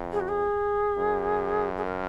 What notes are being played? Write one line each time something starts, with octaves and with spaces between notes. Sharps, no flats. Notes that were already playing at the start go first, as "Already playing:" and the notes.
Already playing: F2
G#4
F#4
G#4
F#2
G#4
A#4